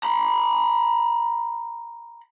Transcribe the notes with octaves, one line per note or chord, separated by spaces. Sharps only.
A#5 B5